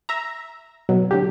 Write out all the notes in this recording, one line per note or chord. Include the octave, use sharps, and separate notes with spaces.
E5 A#5
B2 F#3
A2 D3 F#3 G4